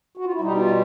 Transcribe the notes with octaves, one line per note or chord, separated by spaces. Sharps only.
F#4
F4
E4
B2 G3 D#4
F4